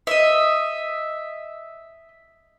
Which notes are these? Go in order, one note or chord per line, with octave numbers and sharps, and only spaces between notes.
D#5 E5